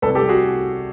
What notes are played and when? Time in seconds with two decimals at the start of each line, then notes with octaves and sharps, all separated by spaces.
0.02 C2 A4 B4
0.15 G4 A4
0.22 C2
0.29 F#4 G#4